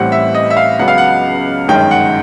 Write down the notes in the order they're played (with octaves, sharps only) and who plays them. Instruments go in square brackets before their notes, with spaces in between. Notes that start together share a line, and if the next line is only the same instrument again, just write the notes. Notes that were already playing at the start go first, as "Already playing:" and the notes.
Already playing: [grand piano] A1 A2 E3 G3 C4 F#5
E5
D#5
E5
F5
C#2 C#3 F#3 B3 F#5
F5
F#5
G1 F#2 D#3 G#3 C#4 G5
F#5